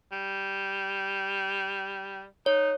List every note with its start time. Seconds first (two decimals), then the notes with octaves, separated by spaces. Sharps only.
0.12 G3
2.46 D#4 C#5